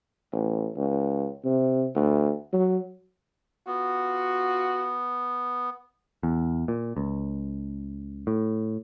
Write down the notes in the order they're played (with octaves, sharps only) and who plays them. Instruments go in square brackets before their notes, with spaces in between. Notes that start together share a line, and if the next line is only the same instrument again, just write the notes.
[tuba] A1
C#2
C3
D2
F#3
[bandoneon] B3 [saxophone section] F4 F#4
[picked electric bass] E2
A#2
C#2
A2